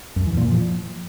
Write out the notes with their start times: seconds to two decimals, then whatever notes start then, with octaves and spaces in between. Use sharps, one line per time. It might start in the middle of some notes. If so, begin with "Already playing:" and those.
0.16 F#2
0.27 E3
0.37 A#2
0.48 F3